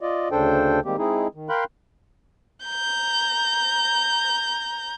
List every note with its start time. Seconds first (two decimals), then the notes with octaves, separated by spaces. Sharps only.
0.01 F4 D5 D#5
0.32 D2 C#3 D4 A4 C5 G5
0.85 D#3 G3 G#3 A#3 C4 G4
0.98 G#3 C4 D#4 E4 G#4
1.35 D#3
1.49 A#4 F5 G5 B5 C6 F#6
2.66 A#5 G6